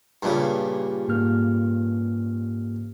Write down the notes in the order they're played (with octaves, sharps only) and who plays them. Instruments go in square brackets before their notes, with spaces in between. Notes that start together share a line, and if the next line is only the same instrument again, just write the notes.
[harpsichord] G2 A#2 C#3
[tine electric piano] G#2 A#3 F6